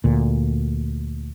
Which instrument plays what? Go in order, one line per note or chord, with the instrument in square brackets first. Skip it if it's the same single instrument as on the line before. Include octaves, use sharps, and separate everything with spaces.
[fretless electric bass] D2 A#2